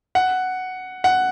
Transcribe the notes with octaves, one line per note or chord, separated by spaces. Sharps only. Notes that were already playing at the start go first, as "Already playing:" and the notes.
F#5
F#5